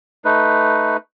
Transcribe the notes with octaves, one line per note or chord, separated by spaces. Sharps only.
A3 D#4 B4